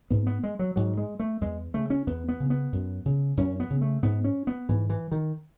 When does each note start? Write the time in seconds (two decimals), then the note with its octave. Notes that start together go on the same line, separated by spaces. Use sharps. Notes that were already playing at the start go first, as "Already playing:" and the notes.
0.10 G#2 B3
0.27 B3
0.44 G#3
0.59 F#3
0.76 G#2 F#3
0.97 G#3
1.20 A3
1.41 E2 G#3
1.74 C#3 A3
1.90 C#4
2.07 E2 B3
2.29 B3
2.40 C#3
2.50 B3
2.72 F#2
3.06 C#3
3.37 F#2 C#4
3.60 B3
3.70 C#3
3.81 A3
4.03 G#2 B3
4.24 C#4
4.47 B3
4.69 G#2 E3
4.90 E3
5.12 D#3